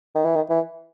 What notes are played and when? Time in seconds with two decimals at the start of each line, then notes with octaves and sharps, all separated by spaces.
0.15 D#3
0.25 E3
0.36 D#3
0.50 E3